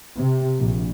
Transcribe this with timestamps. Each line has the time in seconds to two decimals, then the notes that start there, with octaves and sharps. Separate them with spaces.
0.17 C3
0.59 A#1